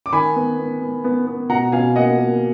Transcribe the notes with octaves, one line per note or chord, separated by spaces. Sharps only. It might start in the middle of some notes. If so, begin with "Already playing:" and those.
D6
D#3 G#5 B5
B3
B3
B3
B3
B3
B2 F#5 A#5
B2 F5 G#5
A#3 D#5 F#5
A#3